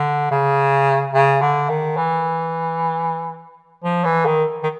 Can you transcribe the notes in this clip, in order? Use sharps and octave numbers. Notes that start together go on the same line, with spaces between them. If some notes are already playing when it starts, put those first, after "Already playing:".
Already playing: D3
C#3
C#3
D3
D#3
E3
F3
E3
D#3
D#3